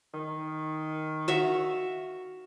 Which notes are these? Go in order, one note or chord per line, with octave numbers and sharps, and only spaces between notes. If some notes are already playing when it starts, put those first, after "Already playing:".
D#3
F#4 E5 F5